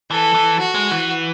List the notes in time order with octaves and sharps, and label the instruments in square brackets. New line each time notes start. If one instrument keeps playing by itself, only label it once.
[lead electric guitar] E3 [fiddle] A4
[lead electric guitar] E3
[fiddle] F#4
[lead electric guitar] G#3
E3